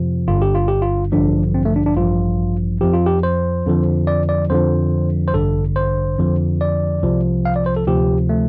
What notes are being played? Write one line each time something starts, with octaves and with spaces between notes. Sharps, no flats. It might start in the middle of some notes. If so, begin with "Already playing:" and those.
Already playing: F2 C3 F3
G1 G2 D3 F4
G4
F4
G4
F4
A1 G2 D3 F3 D4
C4
A3
D4
D4
A1 G2 F3 F4
F2 F3 G4
F4
G4
C5
F2 D3 F3
D5
D5
F2 D3 F3 C5
C5
A1 G2 D3 A4
C5
F2 D3 F3
D5
C2 C3 F3
F5
D5
C5
A4
D2 C3 F3 G4
A3